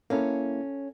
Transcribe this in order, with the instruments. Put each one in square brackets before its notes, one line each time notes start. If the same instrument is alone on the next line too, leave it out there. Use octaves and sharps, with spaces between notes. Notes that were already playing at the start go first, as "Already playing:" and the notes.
[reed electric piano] A#3 E4 [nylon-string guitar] C#4 A4 F5